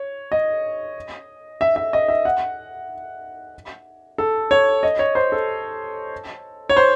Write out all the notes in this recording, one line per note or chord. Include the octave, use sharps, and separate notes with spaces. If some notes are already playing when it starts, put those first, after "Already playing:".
Already playing: C#5
D#5
E5
E5
D#5
E5
F#5
A4
C#5
D#5
C#5
C5
A4
C#5
C5